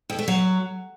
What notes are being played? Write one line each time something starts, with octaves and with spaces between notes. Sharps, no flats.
F2
A3
F#3